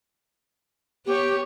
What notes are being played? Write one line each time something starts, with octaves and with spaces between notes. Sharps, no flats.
B3 G4 C#5